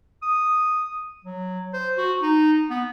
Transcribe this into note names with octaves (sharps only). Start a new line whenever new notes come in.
D#6
F#3
C5
F#4
D#4
B3